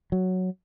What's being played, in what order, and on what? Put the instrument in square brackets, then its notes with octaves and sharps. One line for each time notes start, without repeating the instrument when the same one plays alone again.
[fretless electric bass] F#3